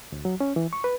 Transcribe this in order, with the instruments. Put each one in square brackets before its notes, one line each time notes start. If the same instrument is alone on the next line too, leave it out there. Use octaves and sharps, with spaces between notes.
[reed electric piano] D2
F#3
C#4
E3
C#6
B4